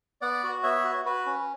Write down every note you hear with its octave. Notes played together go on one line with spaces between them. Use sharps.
B3 D5 F#5
F#4
B3 C#5 E5
F#4
F#4 B4
C#4